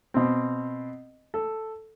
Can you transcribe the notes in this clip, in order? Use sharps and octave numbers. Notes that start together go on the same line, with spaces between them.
B2 C4
A4